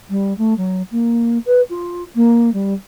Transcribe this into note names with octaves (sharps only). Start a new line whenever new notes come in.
G3
A3
F#3
A#3
B4
F4
A#3
G3